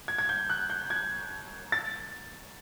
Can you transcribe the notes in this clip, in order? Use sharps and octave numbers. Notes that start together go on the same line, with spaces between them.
G#6
G#6
G6
F#6
G6
G#6
A6